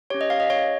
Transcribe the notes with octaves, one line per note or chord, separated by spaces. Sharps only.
C#4 G4 C#5
D#5
F5
D#5
C#5